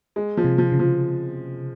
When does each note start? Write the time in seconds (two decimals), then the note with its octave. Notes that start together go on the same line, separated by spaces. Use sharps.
0.16 G#3
0.37 F3
0.44 C3
0.58 F3
0.72 C#3
0.79 F3